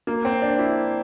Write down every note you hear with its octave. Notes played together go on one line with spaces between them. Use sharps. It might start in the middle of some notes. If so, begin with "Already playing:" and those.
A#3
C4
D4
E4